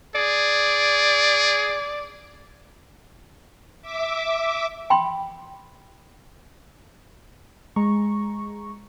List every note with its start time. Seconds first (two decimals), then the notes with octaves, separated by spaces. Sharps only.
0.15 G#4 D5
3.82 E5 D6
4.90 G5 B5 C6
7.76 G#3 A#5 C#6